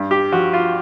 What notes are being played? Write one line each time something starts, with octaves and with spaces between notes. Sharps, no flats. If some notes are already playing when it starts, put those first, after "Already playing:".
Already playing: G2
G4
F3 F#4
F4